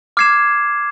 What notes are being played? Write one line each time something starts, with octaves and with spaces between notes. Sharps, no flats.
D6 F6 G#6 C7 E7